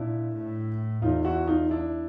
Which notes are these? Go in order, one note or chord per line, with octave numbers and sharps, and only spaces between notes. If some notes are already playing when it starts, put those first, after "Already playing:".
Already playing: A#2 D4 E4
A2
E2 D#4 F4
E4 F#4
D#4 F4
D4 E4